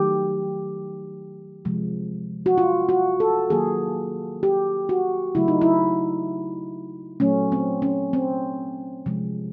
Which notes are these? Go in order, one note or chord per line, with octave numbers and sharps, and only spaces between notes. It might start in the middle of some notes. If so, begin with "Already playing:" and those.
Already playing: D#3 F#3 A3 G4
C3 F3 G#3
F#4
F4
F#4
A4
D#3 F#3 A#3 G#4
G4
F#4
C#3 F#3 A3 E4
D#4
E4
A#2 F#3 A3 C#4
C4
C#4
C4
C3 F3 G#3